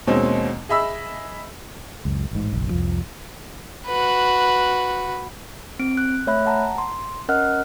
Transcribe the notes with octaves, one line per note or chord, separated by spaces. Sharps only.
D#2 B2 G#3 C4 C#4 D#4
G#4 D#5 E5 B5 E6
C#2 F#2
A1 G#2
F#1 B1
C2 F2 F3
F#4 B4
C4 D7
F#6
A3 C#5 E5 B5 F#6
F#5 A5 A#5
C6
C#4 A#4 D#5 F#5 F6 F#6